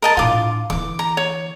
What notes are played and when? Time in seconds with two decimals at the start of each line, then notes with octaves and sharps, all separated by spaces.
0.02 A#4 D#5 A5
0.17 A2 D4 F4 D6
0.70 D3 E3 D6
0.99 A#5
1.17 C#5